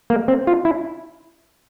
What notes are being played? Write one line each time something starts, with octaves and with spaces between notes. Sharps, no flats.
A#3
C4
F4
E4